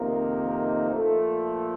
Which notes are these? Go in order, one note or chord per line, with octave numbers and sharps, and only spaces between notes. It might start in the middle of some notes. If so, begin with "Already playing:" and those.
Already playing: F2 C3 D#3 A#3 D#4
A#2 F3 A3